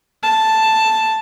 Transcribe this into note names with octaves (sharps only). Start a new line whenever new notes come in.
A5